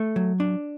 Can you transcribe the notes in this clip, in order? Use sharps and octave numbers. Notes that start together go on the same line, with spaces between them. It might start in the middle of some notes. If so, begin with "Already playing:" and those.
Already playing: A3
F#3
D4